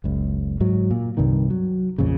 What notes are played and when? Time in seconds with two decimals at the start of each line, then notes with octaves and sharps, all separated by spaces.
0.04 F#1 C#2
0.61 G#2 F#3
0.91 A#2
1.17 C2 G2 C3 D#3
1.50 F#3
1.98 A#1 F2 A#2 C#3